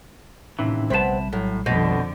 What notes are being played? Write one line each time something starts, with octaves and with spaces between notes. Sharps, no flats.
D#2 A2 C3 E3 C#4 D#4
A#1 C3 G3 B3 C4 B4 A5
A2 F#3
F2 B2 D3 C5 D#5